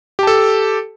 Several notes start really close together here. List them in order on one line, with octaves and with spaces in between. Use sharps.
G4 A5 A4